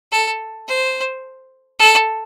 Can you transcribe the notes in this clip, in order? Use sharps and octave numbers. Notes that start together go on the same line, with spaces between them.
A4
C5
A4